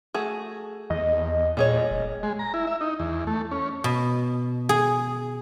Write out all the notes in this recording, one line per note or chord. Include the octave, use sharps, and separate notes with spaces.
A3 F#4 G#4
E2 D#5
A#2 G3 G#4 C#5
F1
G#3
A#5
E4
E5
D#4
E2
A3
C#4
B2
G#4